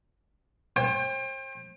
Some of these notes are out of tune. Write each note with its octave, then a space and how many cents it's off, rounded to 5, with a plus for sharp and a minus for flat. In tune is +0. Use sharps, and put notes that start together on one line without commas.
C5 +40 G5 +30